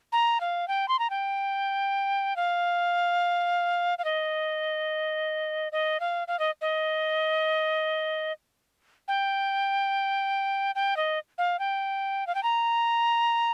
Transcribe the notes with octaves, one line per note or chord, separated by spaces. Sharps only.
A#5
F5
G5
C6
A#5
G5
F5
F5
D#5
D#5
F5
F5
D#5
D#5
G5
G5
D#5
F5
G5
F5
G5
A#5